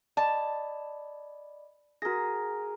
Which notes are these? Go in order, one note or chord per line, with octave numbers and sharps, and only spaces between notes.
D5 D#5 A5 B5
F#4 G#4 A#4 A#6